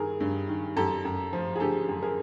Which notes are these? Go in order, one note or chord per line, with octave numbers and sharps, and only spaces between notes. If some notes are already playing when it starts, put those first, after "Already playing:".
Already playing: G2 D#3 G#4 A#4
G2
D#3
F#2 G4 A4
F#2
F3
G#4
D3 G4 A4
F#2
G#4 A#4